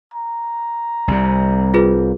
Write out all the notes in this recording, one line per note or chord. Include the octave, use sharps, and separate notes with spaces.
A#5
C2 C3 G3
F4 G#4 B4